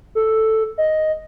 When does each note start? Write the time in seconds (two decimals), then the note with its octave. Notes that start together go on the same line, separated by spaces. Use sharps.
0.15 A4
0.78 D#5